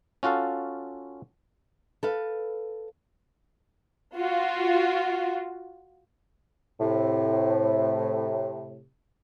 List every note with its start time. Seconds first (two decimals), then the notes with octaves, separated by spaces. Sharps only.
0.23 C#4 F4 F#4 A4 F5
2.03 A4 B4 F5
4.16 F4 F#4
6.80 A2 C3